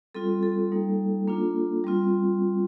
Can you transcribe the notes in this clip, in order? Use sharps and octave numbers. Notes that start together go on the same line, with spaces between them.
G3 C4 F4 A4
A4
G3 A#3 D#4
A#3 D4 F4
G3 C4 F4